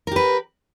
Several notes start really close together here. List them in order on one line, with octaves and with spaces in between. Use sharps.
A#4 G4 B4